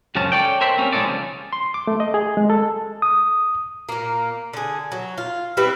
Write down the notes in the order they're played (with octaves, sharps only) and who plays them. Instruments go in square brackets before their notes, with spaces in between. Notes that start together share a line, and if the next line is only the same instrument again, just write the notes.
[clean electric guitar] C#2 F#2 C#3 F3 C#4 A5
A4 B4 C#5 D5 G5
A#4 C5 E5 G5 B5
G3 A#3 C4 C#4
F3 G#3 A#3 D#4 A4 D5
C#3 F3
[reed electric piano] C6
D6
A3
D#5
G#4
G#3
A4
[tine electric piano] D#6
[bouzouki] A#2 A#3
D3 G#4
F#3
F4
G3 C4 E4 B4